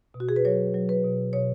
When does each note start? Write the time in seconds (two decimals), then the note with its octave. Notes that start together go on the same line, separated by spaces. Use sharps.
0.14 B2
0.20 F#4
0.29 G#4
0.36 B4
0.45 F#3 C#5
0.74 F#3
0.89 B4
1.04 B2
1.33 B2 C#5